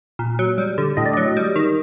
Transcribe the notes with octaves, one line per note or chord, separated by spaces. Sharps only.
A#2
F#3
G3
D3
A2 D#5
D5
F#3 D#5
G3
D#3